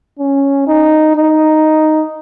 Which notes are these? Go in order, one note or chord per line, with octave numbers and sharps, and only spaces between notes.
C#4
D#4
D#4